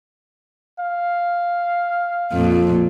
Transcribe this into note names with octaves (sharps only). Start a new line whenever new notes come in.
F5
F2 A#2